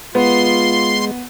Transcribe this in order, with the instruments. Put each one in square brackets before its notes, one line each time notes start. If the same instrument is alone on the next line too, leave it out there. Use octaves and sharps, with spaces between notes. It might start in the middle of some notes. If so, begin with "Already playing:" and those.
[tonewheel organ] G#3 [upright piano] B3 [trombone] F4 [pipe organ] C6